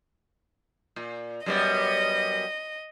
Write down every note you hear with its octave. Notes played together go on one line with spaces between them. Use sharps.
A#2
F#2 G3 B3 D#5